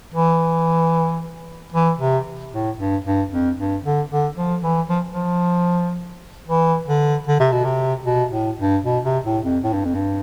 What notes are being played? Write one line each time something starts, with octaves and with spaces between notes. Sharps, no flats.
E3
E3
C3
A2
G2
G2
F2
G2
D3
D3
F3
E3
F3
F3
E3
D3
D3
C3
B2
C3
B2
A2
G2
B2
C3
A2
F2
A2
G2
F2
G2